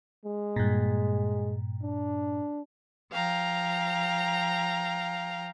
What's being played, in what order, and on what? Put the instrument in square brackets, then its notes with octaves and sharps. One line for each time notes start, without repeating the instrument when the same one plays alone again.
[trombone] G#3
[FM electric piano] G2 A#2
[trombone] D4
[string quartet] F3 F5 G5 A#5